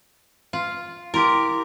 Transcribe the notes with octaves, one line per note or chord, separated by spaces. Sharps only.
F4
E4 G4 A#4 C6 D6